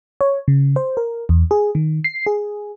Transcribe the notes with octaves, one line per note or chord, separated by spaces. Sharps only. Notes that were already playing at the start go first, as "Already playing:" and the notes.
C#5
C#3
C5
A#4
E2
G#4
D#3
C7
G#4